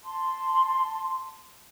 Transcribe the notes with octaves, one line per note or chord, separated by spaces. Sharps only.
A5 C6